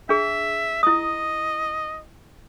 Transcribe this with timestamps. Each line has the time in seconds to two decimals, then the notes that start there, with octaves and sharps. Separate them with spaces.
0.09 D4 G#4 E5
0.83 E4 D#5 D#6